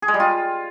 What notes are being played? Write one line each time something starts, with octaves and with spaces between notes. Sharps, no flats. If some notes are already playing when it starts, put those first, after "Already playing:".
G#4
G#3
G3
F4